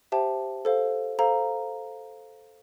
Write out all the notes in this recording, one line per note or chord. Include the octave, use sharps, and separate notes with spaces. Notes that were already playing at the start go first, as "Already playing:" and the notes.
G4 C5 E5 G5 A5
A4 C5 F5
A4 C5 F5 A#5